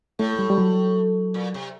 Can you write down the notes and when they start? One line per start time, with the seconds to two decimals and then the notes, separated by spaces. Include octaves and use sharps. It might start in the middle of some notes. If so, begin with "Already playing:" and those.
0.19 A2 A3
0.39 G3
0.50 G3
0.58 F#3
1.34 A#2
1.54 C3